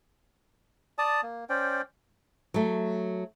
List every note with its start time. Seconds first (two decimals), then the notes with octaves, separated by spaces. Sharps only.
0.98 D5 A5 D#6
1.23 A#3
1.49 C#4 C5 D5 G5
2.54 F#3 A3